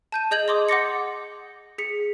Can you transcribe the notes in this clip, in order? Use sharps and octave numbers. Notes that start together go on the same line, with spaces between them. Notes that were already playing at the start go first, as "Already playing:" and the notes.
A5 G6 D#7
G#4 D#5 G6 G#6 F#7
D#5 C6 D6 D#6
F#5 C6 D6 A6 A#6 C#7
G#4 B6 C#7